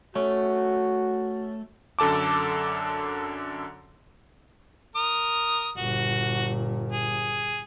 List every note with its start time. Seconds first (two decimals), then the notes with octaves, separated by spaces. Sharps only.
0.16 A3 C#4 F#4
1.99 F#2 D3 A4 A5 D6
4.96 A#4 D#6
5.78 G1 A#2 F#4
6.92 G#4